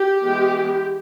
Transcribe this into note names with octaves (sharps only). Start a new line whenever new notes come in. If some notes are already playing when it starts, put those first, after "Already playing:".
Already playing: G4
E3 G#3 B3